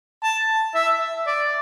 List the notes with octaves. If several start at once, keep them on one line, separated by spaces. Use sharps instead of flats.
A5
E5
D5